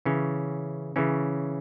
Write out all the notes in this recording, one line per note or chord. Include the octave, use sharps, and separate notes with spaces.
C#3 E3 C#4
C#3 E3 C#4